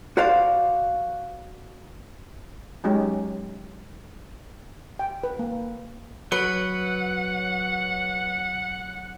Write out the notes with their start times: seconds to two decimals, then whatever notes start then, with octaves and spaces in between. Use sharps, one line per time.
0.17 F#4 C5 D5 F5
2.84 F#3 G#3 C#4 D#4 G4
4.99 G5
5.24 B4
5.39 A#3
6.32 F#3 B4 F#5